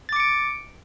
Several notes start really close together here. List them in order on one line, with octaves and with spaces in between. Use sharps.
A6 D6 C#7 D7